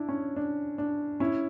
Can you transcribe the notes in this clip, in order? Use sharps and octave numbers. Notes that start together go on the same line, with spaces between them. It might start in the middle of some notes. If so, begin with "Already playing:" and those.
Already playing: D4 E4
C#4
D4
D4
C#4 E4